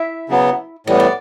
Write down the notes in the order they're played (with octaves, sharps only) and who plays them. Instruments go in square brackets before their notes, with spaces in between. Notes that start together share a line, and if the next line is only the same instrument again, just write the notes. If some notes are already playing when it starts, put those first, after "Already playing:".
Already playing: [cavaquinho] E4 E5
[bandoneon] C#3 F#3 B3
[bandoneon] A2 E3 G3 B3 [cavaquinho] D#5
[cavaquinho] D5